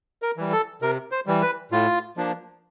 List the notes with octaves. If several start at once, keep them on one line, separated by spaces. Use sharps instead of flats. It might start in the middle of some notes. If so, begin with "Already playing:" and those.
A#4
E3 G3
A4
C3 A#4
C5
E3 G3
B4
A2 F4
F3 A#3 D4